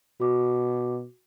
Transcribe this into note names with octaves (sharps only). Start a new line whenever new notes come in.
B2 F#4 D6